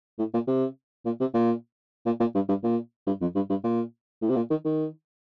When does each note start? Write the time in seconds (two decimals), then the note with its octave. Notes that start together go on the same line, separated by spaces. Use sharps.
0.19 A2
0.34 A#2
0.48 C3
1.06 A#2
1.20 C3
1.34 A#2
2.06 A#2
2.20 A#2
2.35 G2
2.49 G2
2.64 A#2
3.07 G2
3.21 F2
3.35 G2
3.50 G2
3.64 A#2
4.22 A2
4.29 C3
4.36 A#2
4.50 D#3
4.65 D#3